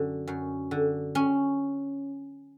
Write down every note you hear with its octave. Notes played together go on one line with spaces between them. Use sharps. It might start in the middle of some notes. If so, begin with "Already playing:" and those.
Already playing: F#2 D3
F#2
D3
C#4